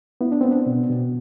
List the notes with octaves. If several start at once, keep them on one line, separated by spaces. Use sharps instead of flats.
B3 E4
D4
B3 C4
D4
B2
B2